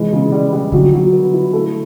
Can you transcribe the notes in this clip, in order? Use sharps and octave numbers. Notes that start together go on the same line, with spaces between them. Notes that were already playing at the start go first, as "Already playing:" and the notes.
Already playing: C3 E3 G#3
C#3
G3
G3
D3 F#3
F#3
B3
E4
A3